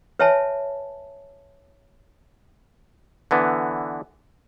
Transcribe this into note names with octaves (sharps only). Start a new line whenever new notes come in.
B4 C#5 E5 G#5 A5 B5
D3 E3 B3